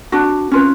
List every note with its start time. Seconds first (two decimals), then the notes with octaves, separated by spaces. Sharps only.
0.12 D4 F#4
0.52 C#4 F4 B4